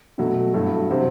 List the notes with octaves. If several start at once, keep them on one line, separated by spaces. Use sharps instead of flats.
B2 F#3 A3
G2 F#3 A3 E4 A4
C3 F#3 C4 G4